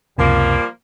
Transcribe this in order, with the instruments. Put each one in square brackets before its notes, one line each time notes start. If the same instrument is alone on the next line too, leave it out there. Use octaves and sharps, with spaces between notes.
[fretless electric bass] C#2 F#2 C3 [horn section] F3 G3 A#3